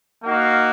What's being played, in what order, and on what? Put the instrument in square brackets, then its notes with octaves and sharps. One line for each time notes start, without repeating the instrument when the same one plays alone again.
[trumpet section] A#3 D#4 F#4 F5